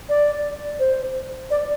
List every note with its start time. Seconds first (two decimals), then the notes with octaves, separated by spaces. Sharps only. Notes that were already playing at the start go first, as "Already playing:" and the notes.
0.09 D5
0.80 C5
1.51 D5